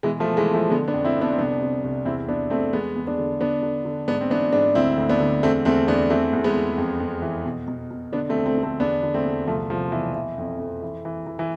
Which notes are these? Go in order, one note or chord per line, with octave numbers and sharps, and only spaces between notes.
B2 E3 G#3
F3 A3
B2
E3 G#3
B2
F3 A3
D3 G#3 B3
B3 D4
F2
C4 E4
F2
B3 D4
C4
C2 B3 D4
C3
C2
E2 C4 E4
E2 B3 D4
E2 A3 C4
E2 G#3 B3
E2
B3 D4
D3
D3 B3 D4
D3
D3
G#2 B3 D4
C4
E3 B3 D4
G#2 B3 D4
D2 C4 E4
D2
B3 D4
D3
E2 A3 C4
E2 A3 C4
E2 B3 D4
E3 A3 C4
E2
G#3 B3
E2
F2
F2
E3
B2
B2
B2
D3 B3 D4
A3 C4
D2
A3 C4
D3
A3 C4
E2 B3 D4
D3
A3 C4
E2
C2 F3 A3
C2 F3
B2 E3
E3
F2
F2
E3
E3
E3
E3